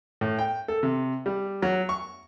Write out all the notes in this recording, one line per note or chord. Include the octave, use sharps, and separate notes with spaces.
A2
G5
A4
C3
G3
F#3
C#6